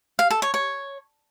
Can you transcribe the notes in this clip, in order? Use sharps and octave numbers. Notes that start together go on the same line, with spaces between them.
F5
A4
C#5
C#5